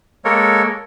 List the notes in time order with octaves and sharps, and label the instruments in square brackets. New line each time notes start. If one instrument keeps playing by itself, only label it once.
[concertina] G#3 A#3 A4 A#4 C#5